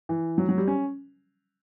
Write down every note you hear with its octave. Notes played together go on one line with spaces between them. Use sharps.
E3
F#3
F#3
G3
C#4